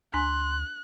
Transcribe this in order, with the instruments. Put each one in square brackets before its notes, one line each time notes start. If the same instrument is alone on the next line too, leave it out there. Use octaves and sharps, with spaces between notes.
[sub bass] D2 [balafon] D4 G#5 [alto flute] C6 [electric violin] F#6